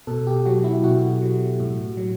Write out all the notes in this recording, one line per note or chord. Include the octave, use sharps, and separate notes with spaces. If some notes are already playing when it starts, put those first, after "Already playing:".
B2 A4
G4
F#3 F#4
E4
B2 F#4
F#3
A2
F#3